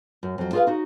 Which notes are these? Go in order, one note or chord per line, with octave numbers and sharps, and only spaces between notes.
F#2
F2 F#3
F4 G#4 A4 B4 F5
D#4 F#4